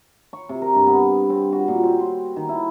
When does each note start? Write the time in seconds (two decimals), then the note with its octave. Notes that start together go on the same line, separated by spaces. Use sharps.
0.33 C#6
0.49 C3
0.62 A#4
0.75 G2
0.87 B3
1.30 C4
1.52 F#4
1.68 A#2
1.83 C4
1.99 C6
2.36 D#3
2.49 E4